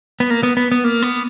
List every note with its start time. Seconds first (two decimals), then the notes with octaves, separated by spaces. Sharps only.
0.20 B3
0.30 A#3
0.43 B3
0.57 B3
0.72 B3
0.84 A#3
1.02 B3